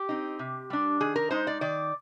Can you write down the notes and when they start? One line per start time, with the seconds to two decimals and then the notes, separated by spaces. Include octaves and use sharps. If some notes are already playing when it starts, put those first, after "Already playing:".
Already playing: G4
0.09 C4 D#4
0.39 C3
0.70 G3 D4
1.00 D#3 G#4
1.16 A#4
1.31 G#3 D#4 C5
1.47 D5
1.61 D#3 D5